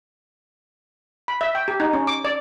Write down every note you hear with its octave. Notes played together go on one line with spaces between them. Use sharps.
B5
E5
G5
G4
D#4
C#4
D6
D5